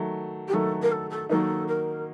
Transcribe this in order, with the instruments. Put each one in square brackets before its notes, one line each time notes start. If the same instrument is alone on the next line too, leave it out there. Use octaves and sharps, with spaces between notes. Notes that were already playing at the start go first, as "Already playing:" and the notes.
Already playing: [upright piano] D#3 F#3 A3
[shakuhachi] G4
[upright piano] D#3 F#3 A3 [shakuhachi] A4
[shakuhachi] A#4
A4
A4
[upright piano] D#3 F#3 A#3 D#4 [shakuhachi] A4
[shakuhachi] A#4